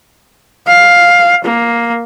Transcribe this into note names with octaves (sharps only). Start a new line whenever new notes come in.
F5
A#3